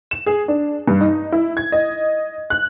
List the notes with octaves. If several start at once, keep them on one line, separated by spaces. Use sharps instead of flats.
E7
G#4
D4
G2
D#4
E4
G#6
D#5
F#6